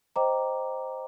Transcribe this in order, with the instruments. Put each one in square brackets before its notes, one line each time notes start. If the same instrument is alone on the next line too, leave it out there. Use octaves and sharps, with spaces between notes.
[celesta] C5 D#5 G5 A#5 D6